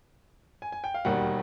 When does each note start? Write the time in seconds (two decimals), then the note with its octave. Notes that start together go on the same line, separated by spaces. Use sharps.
0.62 G#5
0.72 G#5
0.84 G5
0.94 F5
1.05 E1 D#2 D#3 G3 A#3 F#5